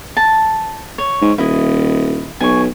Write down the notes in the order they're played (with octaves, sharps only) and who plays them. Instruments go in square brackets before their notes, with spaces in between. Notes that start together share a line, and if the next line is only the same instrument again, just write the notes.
[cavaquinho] A5
C#5
[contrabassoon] G#2
[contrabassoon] D#1 [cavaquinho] E4 D#5
[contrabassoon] B1 [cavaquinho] G#5 C#6